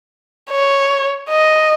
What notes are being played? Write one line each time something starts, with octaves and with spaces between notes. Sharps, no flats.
C#5
D#5